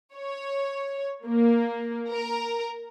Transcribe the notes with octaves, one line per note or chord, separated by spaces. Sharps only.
C#5
A#3
A#4